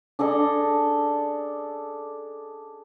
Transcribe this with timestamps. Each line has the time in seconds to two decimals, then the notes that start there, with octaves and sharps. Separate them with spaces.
0.19 D4 G#4 A4 D#5